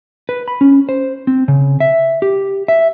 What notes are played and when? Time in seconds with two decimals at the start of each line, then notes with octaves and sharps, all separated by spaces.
0.29 B4
0.48 B5
0.61 C#4
0.89 C5
1.27 C4
1.48 C#3
1.80 E5
2.22 G4
2.68 E5